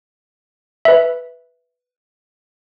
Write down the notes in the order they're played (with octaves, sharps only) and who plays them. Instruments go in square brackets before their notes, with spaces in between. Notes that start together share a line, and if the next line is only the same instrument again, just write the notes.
[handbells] B4 E5